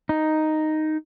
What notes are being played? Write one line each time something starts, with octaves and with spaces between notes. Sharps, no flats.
D#4